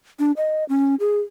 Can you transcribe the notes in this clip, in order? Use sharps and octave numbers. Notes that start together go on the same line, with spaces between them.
D4
D#5
C#4
G#4